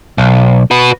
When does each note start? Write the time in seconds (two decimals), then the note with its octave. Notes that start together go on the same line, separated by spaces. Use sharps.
0.18 B1
0.71 F#4 B4